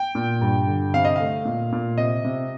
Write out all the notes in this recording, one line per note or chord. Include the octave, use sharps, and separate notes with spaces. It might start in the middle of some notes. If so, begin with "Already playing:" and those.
Already playing: G5
A#2
G2
D3
C3 F5
D#5
A3 F5
A#2
A#2
C3 D#5
C3